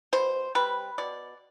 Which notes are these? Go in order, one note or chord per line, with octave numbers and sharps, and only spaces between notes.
B2 C5
G3 C4 B4
B2 D5